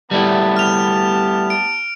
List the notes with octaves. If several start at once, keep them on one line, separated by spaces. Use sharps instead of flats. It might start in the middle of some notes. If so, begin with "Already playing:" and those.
G3 A3 B3 E4 G4 A5
F6 F7
D7